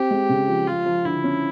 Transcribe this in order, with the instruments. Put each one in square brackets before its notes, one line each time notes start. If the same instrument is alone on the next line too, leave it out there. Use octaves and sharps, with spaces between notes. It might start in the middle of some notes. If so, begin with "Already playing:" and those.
Already playing: [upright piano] C4 [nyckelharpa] G4
[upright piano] G#3
C#3
F3
[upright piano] F3 [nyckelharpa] F4
[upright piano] F3
[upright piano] D3 [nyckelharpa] E4
[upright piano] C#4